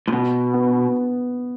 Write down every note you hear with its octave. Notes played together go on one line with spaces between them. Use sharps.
A2
B2 B3
B3